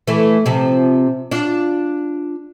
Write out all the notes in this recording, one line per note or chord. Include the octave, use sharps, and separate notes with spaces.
E3 A3
C3 F3
D4 F4